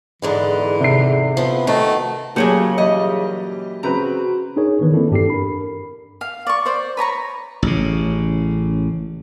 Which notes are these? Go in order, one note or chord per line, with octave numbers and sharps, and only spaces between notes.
E2 G#2 D3 E3
C3 C7
F3 B3
D#3 A3 F#4
A#2 C#3 F#3 A3 G4 G#4 F#7
E3 G3 D#5
C#3 C4 F#4 B4 A#5
D4 D#4 G#4 A#4 C#5
D#3 E3 B3 D4 B4
A#3 C4 D4 E4 A4
G2 D4 G4 A4 C7
A#4 B5
F5
D5 C#6
C5 D5
B4 C#5 A#5 C#6
A1 C#3